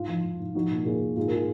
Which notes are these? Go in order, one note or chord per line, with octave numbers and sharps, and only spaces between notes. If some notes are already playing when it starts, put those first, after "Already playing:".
Already playing: G#2 F4
F3
G#2
G#2
F3 D#4 F#4
A#2
A#2 F4 G#4
A#2
G#2 F4 G#4
A#4
F4 G#4